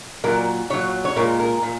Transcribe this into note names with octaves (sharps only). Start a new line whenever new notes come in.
A#2 F#3 A#4
A#2 F#3 C#5
C#5
A#2 G#3 A#4
A#4
A#2